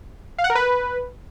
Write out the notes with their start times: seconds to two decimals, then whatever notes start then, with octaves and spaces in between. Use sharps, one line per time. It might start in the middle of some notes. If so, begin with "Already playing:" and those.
0.38 F5
0.44 F#5
0.50 A#4
0.55 B4